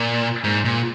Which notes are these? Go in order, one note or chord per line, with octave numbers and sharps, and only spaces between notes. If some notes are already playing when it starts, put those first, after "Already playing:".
Already playing: A#2
G#2
A#2